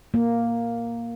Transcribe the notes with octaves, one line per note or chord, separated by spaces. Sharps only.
A#3